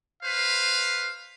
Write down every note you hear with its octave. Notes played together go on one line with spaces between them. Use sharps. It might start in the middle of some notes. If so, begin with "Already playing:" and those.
B4 C5 F5